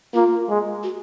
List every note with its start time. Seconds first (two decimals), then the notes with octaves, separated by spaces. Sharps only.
0.14 A#3 F4
0.48 G#3
0.84 F#4